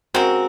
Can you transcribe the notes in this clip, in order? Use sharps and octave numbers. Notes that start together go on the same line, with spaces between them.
C#3 G#3 C4 F#4 A#4